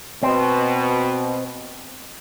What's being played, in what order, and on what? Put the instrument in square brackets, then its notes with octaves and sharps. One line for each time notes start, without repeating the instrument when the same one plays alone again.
[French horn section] B2 [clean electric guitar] C4